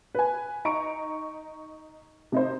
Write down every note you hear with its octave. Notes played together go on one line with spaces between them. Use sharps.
B4 G#5
D#4 A#5 C#6 D7
C3 D#4 C5